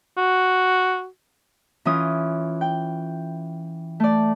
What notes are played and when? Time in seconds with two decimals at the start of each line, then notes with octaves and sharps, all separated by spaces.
0.18 F#4
1.85 E3 C#4 F4 D#6
2.61 G5
4.00 A3 D5